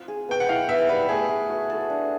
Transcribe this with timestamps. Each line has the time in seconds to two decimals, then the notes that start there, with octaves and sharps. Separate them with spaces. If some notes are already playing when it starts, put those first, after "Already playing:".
Already playing: C4 F4
0.08 G#4
0.29 B3 G5
0.40 F#5
0.49 E4 F5
0.69 B3 E5
0.88 G3 B4
1.09 A3 G#4
1.29 A3
1.49 F#4
1.70 A4
1.90 D4